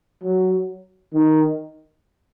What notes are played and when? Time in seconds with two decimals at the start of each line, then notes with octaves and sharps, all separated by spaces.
0.24 F#3
1.14 D#3